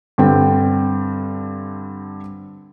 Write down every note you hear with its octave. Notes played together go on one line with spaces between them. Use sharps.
G2 D3 C4 G5